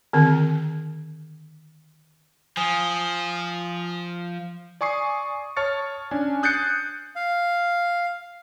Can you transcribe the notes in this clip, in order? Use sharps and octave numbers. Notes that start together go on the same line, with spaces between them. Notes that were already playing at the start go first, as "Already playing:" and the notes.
D3 D#3 C4
F3 G#5 D#6
D5 G#5 C#6 D#6 C7
C#5 A5 C#6 F6 A6 C#7
C#4 D4 G#5
D#6 F#6 G6 A6 C7 C#7
F5